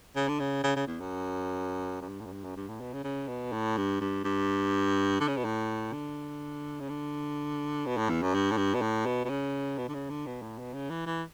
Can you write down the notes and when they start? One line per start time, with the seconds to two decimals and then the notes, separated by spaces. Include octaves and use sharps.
0.16 C#3
0.28 D3
0.39 C#3
0.64 C#3
0.76 C#3
0.87 E2
1.00 F#2
2.01 F#2
2.08 G2
2.20 A2
2.26 F#2
2.32 G2
2.44 F#2
2.56 G2
2.68 A2
2.80 B2
2.93 C#3
3.04 C#3
3.28 B2
3.52 A2
3.77 G2
4.00 G2
4.24 G2
5.20 D3
5.28 C#3
5.37 B2
5.45 A2
5.93 D3
6.80 C#3
6.89 D3
7.86 B2
7.97 A2
8.09 E2
8.22 F#2
8.34 G2
8.51 A2
8.57 G2
8.74 B2
8.81 A2
9.06 B2
9.25 B2
9.29 C#3
9.78 B2
9.89 D3
9.94 C#3
10.10 D3
10.26 B2
10.42 A2
10.59 B2
10.74 C#3
10.90 E3
11.06 E3